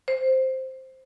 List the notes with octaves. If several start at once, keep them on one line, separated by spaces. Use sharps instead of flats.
C5